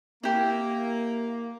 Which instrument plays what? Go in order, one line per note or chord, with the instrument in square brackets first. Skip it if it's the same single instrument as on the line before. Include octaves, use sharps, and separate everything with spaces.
[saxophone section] A#3 [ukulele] E4 G4